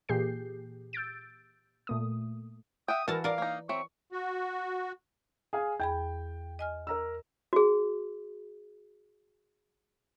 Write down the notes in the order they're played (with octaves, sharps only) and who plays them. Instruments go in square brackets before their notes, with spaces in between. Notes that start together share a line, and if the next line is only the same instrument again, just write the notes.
[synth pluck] A#2 E3 G4 G#4 G6 C7
E6 G6 A6 D7
A#2 A3 D#6
[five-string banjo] E5 F#5 G5 [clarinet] D#6
[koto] E3 A5 [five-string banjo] F#4 [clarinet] A#4
[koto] A#4 D5 [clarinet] F5
[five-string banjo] A#3 D#4
[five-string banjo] F#3 C4 E5 [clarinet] C#6
[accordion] F#4
[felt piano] G#4 F5 G#5
[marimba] E2 G#4 B5 [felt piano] G5
[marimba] D#5 G#5 F6
[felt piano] A#4 A#5 E6
[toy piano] F#4 G#4